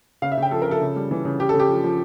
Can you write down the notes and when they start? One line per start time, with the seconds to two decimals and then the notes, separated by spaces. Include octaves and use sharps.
0.22 C#3 F5
0.32 E5
0.37 C#3
0.42 G5
0.51 F3 A4
0.62 A#4
0.66 F3
0.71 A4
0.81 C#3
0.96 G3
1.11 E3
1.25 C#3
1.40 C#3 G4
1.49 A4
1.54 C#3
1.60 G4
1.69 F3
1.84 F3